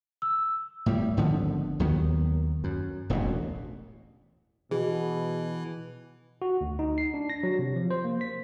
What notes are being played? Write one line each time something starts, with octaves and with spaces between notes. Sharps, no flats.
E6
A2 G3
G#1 D3 F3 B3
D#2 D#3 F#3 B3
F#2
E1 A1 D2 B2
B2 E3 G#4
F#4
D2
D#4
C7
D4
A#6
F#3
C3
F3
C5
A#3
B6